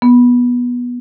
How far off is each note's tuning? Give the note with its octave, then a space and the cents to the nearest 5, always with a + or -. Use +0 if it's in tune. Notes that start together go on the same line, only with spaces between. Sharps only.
B3 -15